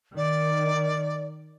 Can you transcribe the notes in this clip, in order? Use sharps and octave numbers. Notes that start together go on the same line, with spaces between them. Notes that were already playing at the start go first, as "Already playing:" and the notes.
D#3 D5